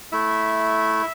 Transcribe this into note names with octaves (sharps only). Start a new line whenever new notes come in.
A3 E4 E5